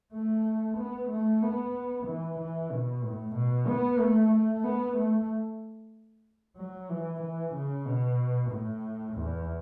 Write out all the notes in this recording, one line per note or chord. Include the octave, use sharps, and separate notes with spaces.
A3
B3
A3
B3
E3
E3
B2
A2
B2
B3
A3
A3
B3
A3
F#3
E3
E3
C#3
B2
A2
E2